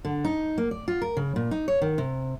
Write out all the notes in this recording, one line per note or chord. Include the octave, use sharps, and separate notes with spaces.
D3
D#4
A#3
D5
F4
A#4
C#3
A#2
D#4
C#5
D#3
C3